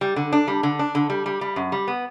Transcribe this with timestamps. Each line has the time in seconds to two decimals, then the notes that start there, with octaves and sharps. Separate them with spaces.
0.01 G3
0.16 D3
0.33 D4
0.48 G3
0.63 D3
0.79 D4
0.95 D3
1.10 G3
1.26 G3
1.41 G3
1.56 F#2
1.72 G3
1.88 B3